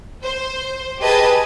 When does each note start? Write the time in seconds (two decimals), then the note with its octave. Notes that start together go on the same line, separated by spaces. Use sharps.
0.22 C5
0.99 G4 G#4 B4 D#5 A5 G#6